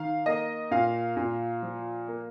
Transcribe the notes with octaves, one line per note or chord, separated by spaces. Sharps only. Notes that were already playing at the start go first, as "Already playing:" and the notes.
Already playing: D#3 F5
A#3 D#5
A#2 F5
A#2
F3
A#3